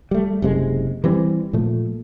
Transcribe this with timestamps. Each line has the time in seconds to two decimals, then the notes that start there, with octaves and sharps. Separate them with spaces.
0.11 G3 A3
0.42 F#1 C3 G#3
1.04 E3 G3 C4
1.53 A#2 F3 A3